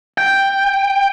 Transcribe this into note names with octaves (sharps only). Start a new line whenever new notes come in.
G5